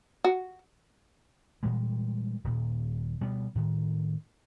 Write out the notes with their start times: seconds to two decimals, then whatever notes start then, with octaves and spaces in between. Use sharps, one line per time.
0.24 F#4
1.63 A#2 E3 G3 G#3
2.44 D#1 A#2
3.21 B2 G3 B3
3.55 A2 D#3